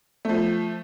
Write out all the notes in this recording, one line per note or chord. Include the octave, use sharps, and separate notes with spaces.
F3 A3